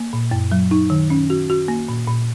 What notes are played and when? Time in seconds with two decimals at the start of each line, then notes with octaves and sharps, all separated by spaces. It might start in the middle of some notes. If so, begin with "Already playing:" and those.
Already playing: A#3
0.13 A#2
0.31 F#2
0.52 F#3
0.71 D#4
0.90 D#3
1.10 C#4
1.30 F#4
1.50 F#4
1.68 A#3
1.88 A#2
2.08 A#2